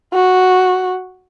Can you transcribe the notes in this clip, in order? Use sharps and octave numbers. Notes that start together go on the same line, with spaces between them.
F#4